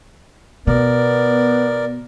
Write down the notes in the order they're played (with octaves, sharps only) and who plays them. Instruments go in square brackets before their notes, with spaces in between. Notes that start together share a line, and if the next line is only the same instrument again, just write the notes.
[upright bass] B2 [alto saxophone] B3 [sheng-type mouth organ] A#4 D5